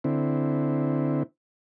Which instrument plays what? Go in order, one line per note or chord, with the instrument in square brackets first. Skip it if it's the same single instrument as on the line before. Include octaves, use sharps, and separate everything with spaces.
[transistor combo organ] D3 C4 E4